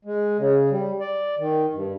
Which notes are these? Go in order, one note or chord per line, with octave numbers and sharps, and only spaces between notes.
G#3
C#3
G3
D5
D#3
G2